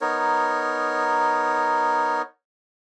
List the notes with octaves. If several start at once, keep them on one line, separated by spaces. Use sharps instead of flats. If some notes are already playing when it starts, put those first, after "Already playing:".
B3 D#4 A#4 C#5